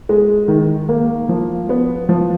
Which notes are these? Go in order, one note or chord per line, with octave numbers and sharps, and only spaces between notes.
G#3
D#3
A#3
F3
B3
F3